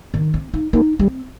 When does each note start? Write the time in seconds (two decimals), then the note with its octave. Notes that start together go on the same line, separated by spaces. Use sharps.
0.14 D#3
0.34 C4
0.54 D#4
0.73 A#3 D#4
0.99 G3 C4